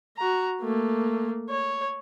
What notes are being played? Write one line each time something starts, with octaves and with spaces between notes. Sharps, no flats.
F#4 A#5
A3 A#3
C#5